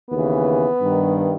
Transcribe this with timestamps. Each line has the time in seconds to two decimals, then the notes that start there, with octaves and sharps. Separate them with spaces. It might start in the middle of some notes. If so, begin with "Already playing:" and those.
0.10 D#2 C#3 E3 B3
0.80 G2 D#3